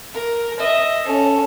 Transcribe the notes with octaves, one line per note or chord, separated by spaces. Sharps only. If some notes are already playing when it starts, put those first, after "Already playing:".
A#4
D#5 E5
C#4 A4